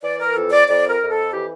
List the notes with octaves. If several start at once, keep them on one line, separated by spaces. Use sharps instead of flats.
E3 D5
A#4
F2 A4
D5
F2 D5
A#4
F2
A4
E3 G4